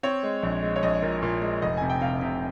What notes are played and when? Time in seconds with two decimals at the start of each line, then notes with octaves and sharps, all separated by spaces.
0.03 C4 C#5
0.23 G#3
0.43 A#1
0.63 G#3
0.76 C#5
0.82 A#1 D#5
1.02 A#2
1.22 A#2
1.42 G#3
1.62 F1 D#5
1.77 C3 G#5
1.90 G5
2.01 C3 F5
2.21 C3